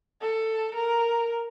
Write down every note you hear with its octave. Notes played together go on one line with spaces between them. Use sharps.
A4
A#4